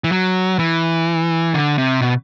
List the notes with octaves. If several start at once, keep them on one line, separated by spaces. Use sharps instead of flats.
E3
F#3
E3
D3
C3
B2